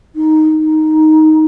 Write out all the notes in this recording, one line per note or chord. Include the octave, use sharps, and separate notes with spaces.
D#4
D#4